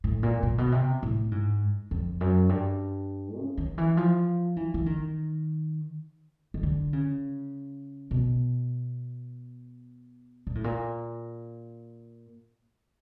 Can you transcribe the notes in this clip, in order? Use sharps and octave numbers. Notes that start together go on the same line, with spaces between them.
A2
A#2
A#2
B2
C3
A2
G#2
F2
F#2
G2
C#3
D#3
E3
F3
E3
E3
D#3
D#3
D3
C#3
B2
A#2
A2
A#2